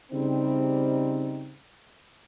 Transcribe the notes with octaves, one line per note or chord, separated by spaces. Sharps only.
C#3 G3 C4 D#4